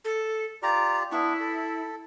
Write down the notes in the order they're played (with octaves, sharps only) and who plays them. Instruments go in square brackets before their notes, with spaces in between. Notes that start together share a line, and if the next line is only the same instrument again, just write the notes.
[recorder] A4
[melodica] F4 G4 D5 [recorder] A#5
[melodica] B3 D4 C#6 [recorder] E4
[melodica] A4